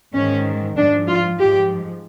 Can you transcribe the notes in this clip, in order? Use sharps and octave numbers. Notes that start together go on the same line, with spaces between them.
G#2 D#3 C#4
G#2 F3 D4
F4
G#2 F3 G4